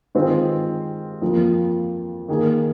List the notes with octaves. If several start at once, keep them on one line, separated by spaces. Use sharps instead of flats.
D#3 G#3 C4 F4 C5
F2 F3 A#3
D#3 A#3 G#4